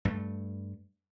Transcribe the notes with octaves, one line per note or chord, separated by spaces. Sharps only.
G2 A3